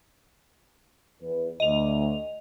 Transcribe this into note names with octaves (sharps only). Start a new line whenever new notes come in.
E2 B4
D2 D#5 F7